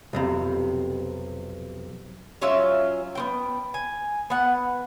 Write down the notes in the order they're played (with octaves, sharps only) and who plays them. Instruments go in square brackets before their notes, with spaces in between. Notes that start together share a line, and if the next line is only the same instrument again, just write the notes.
[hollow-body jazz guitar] B1 F2 C3
[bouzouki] F#3 C#4 F4 E5
B3 C4 G5
G#5
B3 F#5